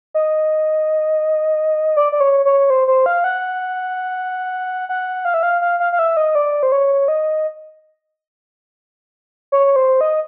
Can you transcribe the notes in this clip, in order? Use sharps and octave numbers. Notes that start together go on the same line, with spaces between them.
D#5
D5
D5
C#5
C#5
C5
C5
F5
F#5
F#5
F5
E5
F5
F5
F5
F5
E5
D#5
D5
C5
C#5
D#5
C#5
C5
D#5